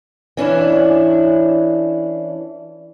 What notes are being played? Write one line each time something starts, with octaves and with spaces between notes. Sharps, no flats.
E3 C#4 D4 E4